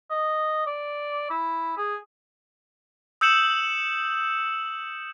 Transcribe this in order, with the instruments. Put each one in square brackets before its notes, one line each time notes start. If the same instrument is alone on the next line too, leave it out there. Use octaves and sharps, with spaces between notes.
[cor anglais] D#5
D5
E4
G#4
[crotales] D#6 E6 G6 C#7 E7 F#7